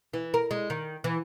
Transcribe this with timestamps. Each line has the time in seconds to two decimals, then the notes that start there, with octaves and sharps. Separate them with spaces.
0.13 E3
0.34 A#4
0.51 G#3
0.70 D#3
1.04 E3